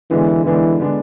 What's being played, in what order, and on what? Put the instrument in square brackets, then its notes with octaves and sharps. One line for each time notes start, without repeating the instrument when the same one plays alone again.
[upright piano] D3 G#3 B3 D4 [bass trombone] E3
[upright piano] D3 G#3 B3 D4 [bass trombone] E3
[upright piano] D3 G#3 B3 D4